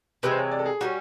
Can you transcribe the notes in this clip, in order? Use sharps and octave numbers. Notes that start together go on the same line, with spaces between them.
C3 E3 G#3 B4
C5
C#5
D5
A4
G#4
G3 A#3 C#4 F#4